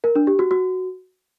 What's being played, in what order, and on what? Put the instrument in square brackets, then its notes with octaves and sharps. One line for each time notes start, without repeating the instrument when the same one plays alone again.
[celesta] A#4
D4
G4
F#4
F#4